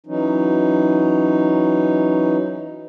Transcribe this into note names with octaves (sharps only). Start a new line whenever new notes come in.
E3 F#3 C#4 D#4